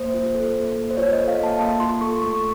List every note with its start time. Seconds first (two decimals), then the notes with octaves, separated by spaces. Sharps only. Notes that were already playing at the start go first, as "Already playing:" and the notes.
Already playing: A#3 C5
0.14 F4
0.35 A4
0.56 A#3
0.76 A#3
0.90 C5
0.97 F4 C#5
1.12 D#5
1.18 A4
1.28 F5
1.39 A#3 A5
1.59 A#3 A5
1.80 F4 C6
2.01 A4 C#6
2.21 A3 C#6